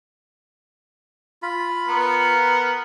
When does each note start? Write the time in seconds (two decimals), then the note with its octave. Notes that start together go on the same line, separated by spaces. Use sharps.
1.42 F4 B5
1.88 B3 A#4